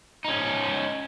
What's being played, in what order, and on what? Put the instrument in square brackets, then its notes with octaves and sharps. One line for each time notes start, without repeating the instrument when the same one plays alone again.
[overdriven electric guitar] C#4 D#4